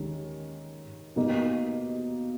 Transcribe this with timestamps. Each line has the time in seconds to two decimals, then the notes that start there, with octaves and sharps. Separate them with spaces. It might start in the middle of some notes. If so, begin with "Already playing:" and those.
Already playing: D#2 D#3 G#3 C#4
1.16 B2 A#3 D#4